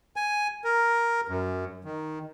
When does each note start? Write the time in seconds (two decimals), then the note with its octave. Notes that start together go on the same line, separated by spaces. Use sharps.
0.16 G#5
0.64 A#4
1.28 F#2
1.85 D#3